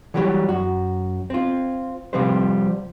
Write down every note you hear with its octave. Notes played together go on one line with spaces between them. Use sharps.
E3 F#3 G3 G4 A#4 C#5
F#2 F#4
C4 F4
C3 F3 G3 C4 B4 C5